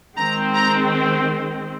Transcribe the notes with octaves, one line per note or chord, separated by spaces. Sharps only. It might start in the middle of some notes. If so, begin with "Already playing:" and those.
D#3 G#3 C4 A#5
A#5